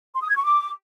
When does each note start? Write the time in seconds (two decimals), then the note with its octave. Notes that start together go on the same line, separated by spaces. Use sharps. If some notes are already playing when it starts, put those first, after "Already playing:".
0.15 C6
0.22 D#6
0.29 G#6
0.36 C#6
0.44 D6